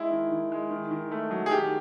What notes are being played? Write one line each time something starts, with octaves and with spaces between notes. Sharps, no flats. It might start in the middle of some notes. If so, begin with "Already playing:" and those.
Already playing: G#3 E4
D#3
D#3
G#3
D#3
D#3
A3
F#3
G#4
D#3 G4